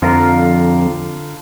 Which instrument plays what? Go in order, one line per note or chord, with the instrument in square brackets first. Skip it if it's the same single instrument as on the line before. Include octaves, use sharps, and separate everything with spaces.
[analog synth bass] F2 [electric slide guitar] D3 F4 A#4